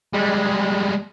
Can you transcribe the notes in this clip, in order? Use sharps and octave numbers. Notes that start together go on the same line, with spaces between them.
G3 G#3